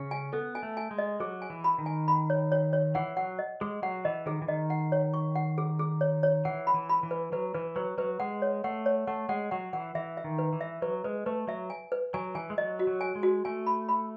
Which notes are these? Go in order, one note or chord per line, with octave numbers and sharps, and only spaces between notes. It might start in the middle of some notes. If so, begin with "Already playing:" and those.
Already playing: C#3 C#4
G#5
B3 A4
G#5
A3
G#5
G#3
D#5
F#3 G#4
G#5
E3
B5
D#3
G#5
B5
C#5
C#5
C#5
E3 F#5
F#3 F#5
D#5
G#3 G#4
F#3 F#5
E3 D#5
D#3 G#4
E3
D#3 D#5
F#5
C#5
C#6
F#5
G#4
G#4
C#5
C#5
E3 F#5
B5
E3
B5
E3
B4
F#3 B4
E3 B4
F#3 B4
F#3 B4
G#3 F#5
C#5
A3 F#5
C#5
A3 F#5
G#3 F#5
F#3 F#5
E3 F#5
E3 E5
E5
D#3
B4
E3
E5
F#3 B4
G#3 B4
A3 B4
F#3 E5
G#5
B4
F#3 G#5
E3 G#5
G#3
F#3 D#5
F#4
F#3
G#5
G#3
F#4
A3 G#5
B5
B5